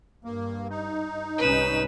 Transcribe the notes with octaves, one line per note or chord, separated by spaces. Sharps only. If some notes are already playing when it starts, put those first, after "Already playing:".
G2 A#3
D#4
C2 G#2 C#4 B4 E7